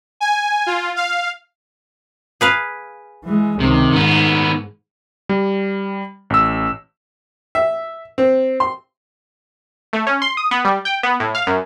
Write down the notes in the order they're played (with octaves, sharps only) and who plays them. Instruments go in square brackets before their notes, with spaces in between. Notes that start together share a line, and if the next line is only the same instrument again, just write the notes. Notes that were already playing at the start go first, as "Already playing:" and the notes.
[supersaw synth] G#5
F4
F5
[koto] G#4 B4 F5
[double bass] E3 G#3
[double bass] C#2 D#3 [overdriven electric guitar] C3
[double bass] G#2 [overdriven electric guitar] D#3 B3
[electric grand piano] G3
A1 E6
[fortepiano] E5
C4
C6
[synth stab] A3
C#4
C6
D#6
B3
G3
G5
B3
A2
F5
F#2